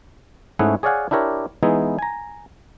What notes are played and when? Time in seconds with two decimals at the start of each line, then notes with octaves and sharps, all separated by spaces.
0.59 G#2 A3 C#4 E4 G#4 F#5
0.83 G#4 C#5 D5 F5 F#5 G#5
1.11 D4 E4 G4 A#4 C#5
1.63 E3 G#3 B3 D#4 E4 G#4
1.99 G#5 A#5